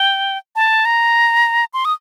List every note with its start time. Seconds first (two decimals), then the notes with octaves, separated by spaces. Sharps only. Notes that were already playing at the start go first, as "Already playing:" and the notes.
Already playing: G5
0.56 A5
0.85 A#5
1.73 C6
1.85 D#6